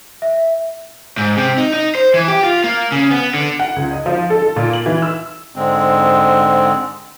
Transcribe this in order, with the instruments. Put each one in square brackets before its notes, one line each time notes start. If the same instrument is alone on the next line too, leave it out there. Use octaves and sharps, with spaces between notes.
[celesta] E5
[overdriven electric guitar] G#2
C3
D#4
D#4
C5
E3
G4
F4
A#3
C#3
B3
D3
[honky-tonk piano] F#5
C#2
D#5
F3
A4
A4
A#2
F#7
E3
E6
[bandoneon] G#2 D3 G#3 C4